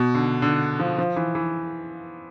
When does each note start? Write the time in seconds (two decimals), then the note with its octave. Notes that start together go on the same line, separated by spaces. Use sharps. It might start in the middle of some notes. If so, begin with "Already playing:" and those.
Already playing: B2
0.15 D3
0.42 D3
0.79 F3
0.98 F3
1.16 E3
1.35 E3